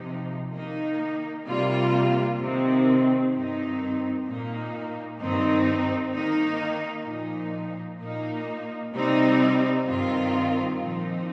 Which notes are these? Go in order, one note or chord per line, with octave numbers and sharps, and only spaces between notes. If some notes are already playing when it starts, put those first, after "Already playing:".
Already playing: C3 F3 D#4
D#3 A#3 D#4
C3 G3 A#3 F4
C3 D#3 C4
G2 D#3 C4 D#4
A#2 A#3 D#4
G2 D#3 C4 D#4
D#3 A#3 D#4
A#2 F3 D#4
A#2 A#3 D#4
C3 G3 C4 D#4
G2 D#3 C4 F4
A#2 F3 C4 D#4